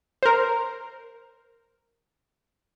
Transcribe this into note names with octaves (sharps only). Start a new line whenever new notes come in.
A#4 C5